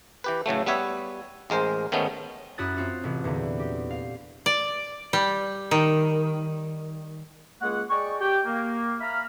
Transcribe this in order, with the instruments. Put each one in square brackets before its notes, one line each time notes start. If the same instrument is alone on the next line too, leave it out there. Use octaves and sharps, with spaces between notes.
[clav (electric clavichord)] E3 G4 B4
A2 C#3 F#3 A3
G3 B3 B4 C#5 E5
A1 G#3 A#4 C5
G#2 D#3 A3 B3 C#4
[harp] F#2 E4 F#4 D#6 F#6 A6
C4 F4 F#4
A1 C3
E2 A#2 D3
G4
F5
[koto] D5
G3
D#3
[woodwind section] C#2 G#3 A#3 G#4 C#5 F#5
G#4 D5 D#5 G5 C#6
G4 G5
A#3
E5 F5 A#5 B5 F6